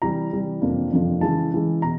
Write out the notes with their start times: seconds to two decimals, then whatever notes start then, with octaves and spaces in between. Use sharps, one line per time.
0.02 C3 E3 G3 A#5
0.32 C3 E3 G3
0.61 F2 C3 F3 A#3 D4
0.91 F2 C3 F3 A#3 D4
1.21 C#3 E3 G#3 A5
1.51 C#3 E3 G#3
1.82 B2 A#5